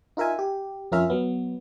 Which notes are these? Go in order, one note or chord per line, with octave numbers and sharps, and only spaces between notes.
D#4 F4 A#4 E5 G#5
G4
F2 C#4 F4 A#4 E5 F6
F#3 B3